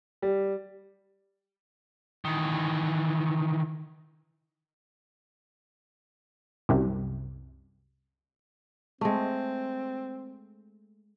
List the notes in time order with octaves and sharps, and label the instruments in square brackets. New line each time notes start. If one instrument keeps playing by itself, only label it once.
[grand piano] G3
[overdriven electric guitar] D#3 E3
[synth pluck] C2 F#2 C3
[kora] G#3 A3 [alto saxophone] C4